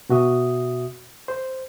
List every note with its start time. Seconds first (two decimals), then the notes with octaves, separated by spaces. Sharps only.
0.09 B2 F#4 E5 D#6
1.28 C5